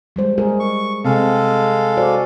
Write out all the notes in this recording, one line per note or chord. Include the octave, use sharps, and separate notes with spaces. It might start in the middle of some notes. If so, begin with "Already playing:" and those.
G3 G#3 C5
G#3 G#4 A#4
C#6
C3 G#3 C4 A4 F5
F#4 C5 D5